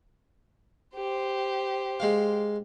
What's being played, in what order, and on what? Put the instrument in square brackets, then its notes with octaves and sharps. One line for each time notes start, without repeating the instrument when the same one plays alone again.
[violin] G4 C5
[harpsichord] G#3 F5